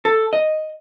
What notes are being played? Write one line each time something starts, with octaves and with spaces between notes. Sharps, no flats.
A4
D#5